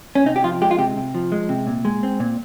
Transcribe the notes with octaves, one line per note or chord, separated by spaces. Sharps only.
C#4
C3 D#4
G4
F3 F4
G#3 G4
F4
C3 G4
C3
F3
G#3
C3
A#2
G#3
C4
A#2